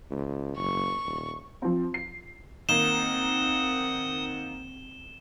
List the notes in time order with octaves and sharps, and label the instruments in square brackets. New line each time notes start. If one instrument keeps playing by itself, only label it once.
[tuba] C#2
[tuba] F#1 [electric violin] C#6
[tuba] D#1
[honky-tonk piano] F3 C4
C7
[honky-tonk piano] D#3 A#3 [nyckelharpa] C4 F#5 [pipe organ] D#6 [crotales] E7 G7